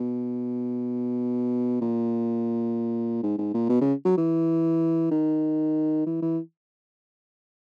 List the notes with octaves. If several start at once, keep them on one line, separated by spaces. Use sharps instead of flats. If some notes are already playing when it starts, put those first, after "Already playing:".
Already playing: B2
A#2
G#2
G#2
A#2
B2
C#3
F#3
E3
D#3
E3
E3